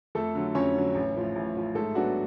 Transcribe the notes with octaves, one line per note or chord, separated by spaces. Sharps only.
F2 A3 A4
D3 F#3
F2 C#4 C#5
D3 F#3
A1
A2 F3
A1
A2 F3
G#2 A3 A4
F#3 B3 D4 F#4